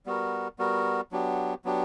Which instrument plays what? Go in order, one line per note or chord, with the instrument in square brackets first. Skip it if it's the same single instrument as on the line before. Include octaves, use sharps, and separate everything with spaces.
[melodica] G3 B3 F#4 A#4
G3 B3 F#4 A#4
F#3 B3 D4 G4
F#3 B3 D4 G4